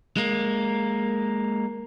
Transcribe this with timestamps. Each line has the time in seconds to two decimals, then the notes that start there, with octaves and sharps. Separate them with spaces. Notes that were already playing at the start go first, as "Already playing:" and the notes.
0.17 G#3 A#3